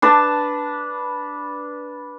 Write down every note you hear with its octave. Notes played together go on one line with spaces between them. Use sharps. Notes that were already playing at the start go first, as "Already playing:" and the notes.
D4 B4 A5